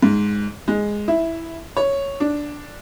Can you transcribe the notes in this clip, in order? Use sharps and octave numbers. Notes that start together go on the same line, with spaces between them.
G#2
G#3
E4
C#5
D4